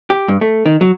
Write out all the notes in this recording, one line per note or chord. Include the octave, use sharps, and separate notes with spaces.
G4
G2
A3
D#3
F#3